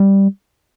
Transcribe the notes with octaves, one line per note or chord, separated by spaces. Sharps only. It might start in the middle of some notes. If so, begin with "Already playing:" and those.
Already playing: G3